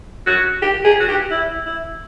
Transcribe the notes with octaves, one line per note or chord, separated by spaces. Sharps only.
F#4
G4
G#4
F#4
G4
E4
E4